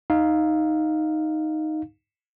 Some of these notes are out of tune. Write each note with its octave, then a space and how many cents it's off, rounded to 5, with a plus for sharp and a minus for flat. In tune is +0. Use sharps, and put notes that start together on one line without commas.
D#4 +0 F5 +5